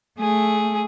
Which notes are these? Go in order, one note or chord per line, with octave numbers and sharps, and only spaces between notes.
A3 G#4